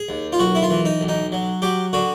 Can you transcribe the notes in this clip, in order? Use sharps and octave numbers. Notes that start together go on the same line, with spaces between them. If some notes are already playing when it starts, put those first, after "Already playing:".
Already playing: G#4
D#2
F4
B1 F#4
E4
F4
E3
D#4
B1
D#4
F#3
F#3 G4
D3 F#4